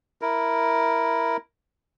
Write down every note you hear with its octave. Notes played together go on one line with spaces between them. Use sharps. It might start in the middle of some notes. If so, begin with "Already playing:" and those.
E4 A#4